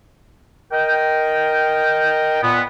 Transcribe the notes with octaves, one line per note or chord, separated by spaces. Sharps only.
A#4 D#5 G5
A#2 B3